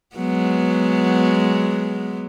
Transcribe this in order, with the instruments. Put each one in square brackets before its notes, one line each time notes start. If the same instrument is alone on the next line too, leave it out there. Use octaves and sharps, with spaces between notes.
[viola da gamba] F#3 G#3 B3